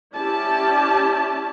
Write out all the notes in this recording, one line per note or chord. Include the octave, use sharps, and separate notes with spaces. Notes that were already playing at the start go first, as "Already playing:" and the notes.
C#4 E4 G4 D5 A5